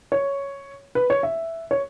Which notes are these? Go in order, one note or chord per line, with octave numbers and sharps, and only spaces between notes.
C#5
B4
C#5
E5
C#5